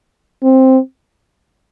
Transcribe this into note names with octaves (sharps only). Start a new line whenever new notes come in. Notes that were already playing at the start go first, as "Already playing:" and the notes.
C4